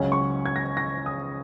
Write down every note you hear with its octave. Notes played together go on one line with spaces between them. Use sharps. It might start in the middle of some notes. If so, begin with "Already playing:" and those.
Already playing: C#2 C#3 F#3 C#4
C#6
G#6
A#6
A#6
D#6